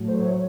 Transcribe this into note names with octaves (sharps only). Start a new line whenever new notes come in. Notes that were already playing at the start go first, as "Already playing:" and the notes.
Already playing: A2 F#3 A3
C5
C#5